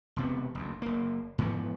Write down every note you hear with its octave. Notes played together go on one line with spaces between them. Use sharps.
E1 C3 B3
F#1 D2
F#1 A#3
G#2 E3 F3 B3